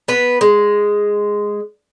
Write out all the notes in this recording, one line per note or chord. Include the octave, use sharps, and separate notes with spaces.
B3 B4
G#3